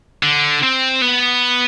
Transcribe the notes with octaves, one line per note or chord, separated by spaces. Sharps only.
D3
C4
B3